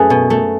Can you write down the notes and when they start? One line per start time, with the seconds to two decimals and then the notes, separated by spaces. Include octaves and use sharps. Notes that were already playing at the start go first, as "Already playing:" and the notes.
Already playing: F#2 A3 G#4 B4
0.10 B2
0.30 A3